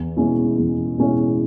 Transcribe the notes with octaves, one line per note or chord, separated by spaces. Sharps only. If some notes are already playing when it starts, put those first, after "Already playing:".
Already playing: E2
B2 G#3 C#4 E4
E2
B2 G#3 C#4 E4